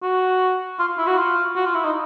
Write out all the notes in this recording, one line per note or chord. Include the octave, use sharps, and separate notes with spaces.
F#4
F4
E4
F#4
F4
F#4
F4
E4
D#4